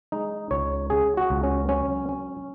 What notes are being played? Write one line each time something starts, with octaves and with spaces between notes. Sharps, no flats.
G#3 D#4
C#2 C#5
C#3 G#4
F#4
C#2
C#4
F#3 C#4
C#4